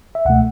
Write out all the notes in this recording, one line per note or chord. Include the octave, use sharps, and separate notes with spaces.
E5
C#2 B2 A3 F#5